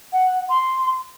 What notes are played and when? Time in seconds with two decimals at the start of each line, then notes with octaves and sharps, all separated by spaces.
0.12 F#5
0.49 C6